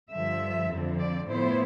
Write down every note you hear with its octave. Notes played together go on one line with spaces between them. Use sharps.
G2 D3 F3 E5
F2 D3 F3 C4
D5
A2 F3 B3 E4 C5